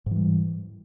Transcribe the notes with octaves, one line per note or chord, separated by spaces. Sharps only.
G#2 E3 G3